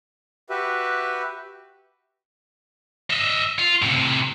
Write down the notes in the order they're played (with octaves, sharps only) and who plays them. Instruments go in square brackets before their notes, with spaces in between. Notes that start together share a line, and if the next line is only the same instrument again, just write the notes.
[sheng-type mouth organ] F#4 G4 B4 E5
[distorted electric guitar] D#5 E5
F4
A2 C3